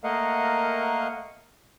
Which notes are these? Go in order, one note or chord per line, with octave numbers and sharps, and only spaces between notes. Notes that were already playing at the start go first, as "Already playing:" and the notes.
A3 A#3 A#4 D#5 F5 F#5